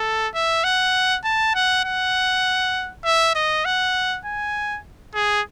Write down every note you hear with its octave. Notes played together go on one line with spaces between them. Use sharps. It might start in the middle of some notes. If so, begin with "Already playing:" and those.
Already playing: A4
E5
F#5
A5
F#5
F#5
E5
D#5
F#5
G#5
G#4